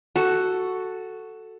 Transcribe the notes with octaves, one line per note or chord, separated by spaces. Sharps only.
F#4 A4